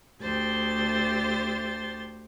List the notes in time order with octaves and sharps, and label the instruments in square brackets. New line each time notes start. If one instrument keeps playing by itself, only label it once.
[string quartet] D2 G4 C5 A6